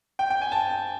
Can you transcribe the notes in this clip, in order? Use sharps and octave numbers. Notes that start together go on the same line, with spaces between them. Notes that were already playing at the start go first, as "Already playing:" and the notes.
G5
G5
G#5
A5